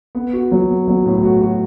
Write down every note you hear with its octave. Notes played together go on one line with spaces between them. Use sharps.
B3
F#4
F#3
B3
F#3
A2
F#4
F#4